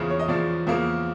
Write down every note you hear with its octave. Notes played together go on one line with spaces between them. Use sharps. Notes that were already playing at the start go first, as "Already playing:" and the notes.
Already playing: E2 C#3 F3
C#5
D#5
E2 C#3 F3 D5
E2 C#3 F3 A#3